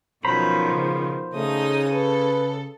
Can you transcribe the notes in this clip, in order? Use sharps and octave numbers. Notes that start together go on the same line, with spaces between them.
B2 D#3 F3 F#3 C#4 C5 A#5 B5
C#3
C#3 A3 D#4 D#6
A4 B4